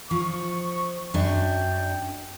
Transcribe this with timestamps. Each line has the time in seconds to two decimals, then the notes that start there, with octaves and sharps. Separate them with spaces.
0.11 F3 C#6
1.14 F#2 F#3 D4 G5